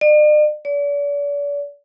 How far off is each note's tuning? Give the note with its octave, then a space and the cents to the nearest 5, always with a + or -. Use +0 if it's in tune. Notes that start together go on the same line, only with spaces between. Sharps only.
D5 +45
D5 -40